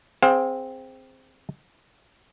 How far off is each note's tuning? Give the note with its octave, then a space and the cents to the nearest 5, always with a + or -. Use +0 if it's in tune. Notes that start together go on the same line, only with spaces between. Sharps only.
C4 +0 G#4 +0 F5 +35